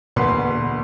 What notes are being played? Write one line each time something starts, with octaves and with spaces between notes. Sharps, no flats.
E1 D2 A#2 A#3 B3 B4 C6